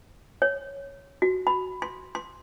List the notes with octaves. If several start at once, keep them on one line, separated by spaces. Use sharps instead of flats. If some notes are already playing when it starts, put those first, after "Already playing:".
C#5
F#4
B5
C6
C6